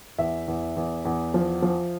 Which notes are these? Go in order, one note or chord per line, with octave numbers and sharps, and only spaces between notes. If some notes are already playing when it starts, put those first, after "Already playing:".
E2 E5
E2
E2
E2
F3
F3